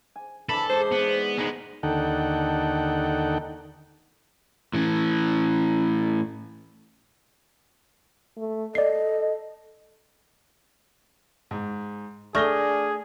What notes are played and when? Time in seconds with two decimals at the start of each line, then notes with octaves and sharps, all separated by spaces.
0.16 G#5
0.49 E3 D4 A4 B5
0.69 G#2 C5 D5
0.92 B3
1.38 G#3 B3 D#4
1.83 D#2 D3 D#4 A4 F#5 G5
4.74 A2 E3
8.37 A3
8.75 A4 D5 D#5 C7
11.51 G#2
12.35 A3 D4 G#4 F6 A#6 G7